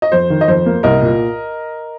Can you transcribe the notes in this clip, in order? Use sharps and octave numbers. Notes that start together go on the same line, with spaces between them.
D#5
F2 C5
D#3
D#5
F2 C5
A#3
C2 A#4 D#5
A#2